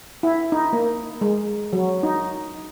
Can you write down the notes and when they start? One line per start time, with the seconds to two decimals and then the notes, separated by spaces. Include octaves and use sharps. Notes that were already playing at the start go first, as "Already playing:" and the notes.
0.23 E4
0.52 D#4
0.73 A#3
1.21 G#3
1.73 F#3
2.03 D#4